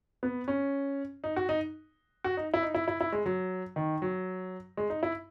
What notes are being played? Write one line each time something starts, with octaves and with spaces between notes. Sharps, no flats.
B3
C#4
D#4
F#4
D#4
F#4
D#4
E4
D#4
E4
E4
E4
G#3
F#3
D#3
F#3
G#3
D#4
E4